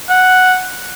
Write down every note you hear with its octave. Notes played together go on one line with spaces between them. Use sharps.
F#5